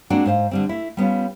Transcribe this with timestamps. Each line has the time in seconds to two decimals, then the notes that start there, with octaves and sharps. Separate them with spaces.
0.10 G#3 A#3 C4 D4 F#4
0.25 G#2 C5 F5
0.51 D3 G3 C4
0.69 A3 E4
0.97 G3 B3 C#4 F4